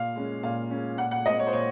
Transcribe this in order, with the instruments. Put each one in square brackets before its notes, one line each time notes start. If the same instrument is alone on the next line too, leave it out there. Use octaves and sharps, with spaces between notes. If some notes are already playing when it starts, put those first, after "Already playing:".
Already playing: [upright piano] A#2 F5
G#3 C#4
A#2 F5
G#3 C#4
A#2 F#5
F#5
G#3 C4 D#5
C#5
C5
A#2 C#5